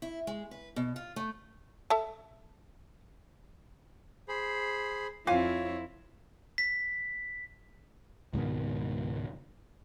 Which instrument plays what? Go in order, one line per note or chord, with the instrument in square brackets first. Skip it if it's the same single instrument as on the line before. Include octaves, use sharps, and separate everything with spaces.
[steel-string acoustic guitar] E4
G#3
B4
B2
F4
A3
[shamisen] A4 E5 A5
[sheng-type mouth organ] G#4 C5 B5
[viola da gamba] F2 C4 E4 [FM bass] F4 [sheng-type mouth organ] C#5 [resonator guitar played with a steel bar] F5 G#5
[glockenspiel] B6
[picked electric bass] C#2 G#2 B2 D#3